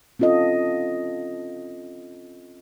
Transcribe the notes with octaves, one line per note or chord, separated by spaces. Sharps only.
C4 C#4 F4 A4 D#5